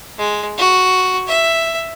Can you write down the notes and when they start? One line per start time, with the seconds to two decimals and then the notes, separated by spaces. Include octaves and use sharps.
0.18 G#3
0.58 F#4
1.28 E5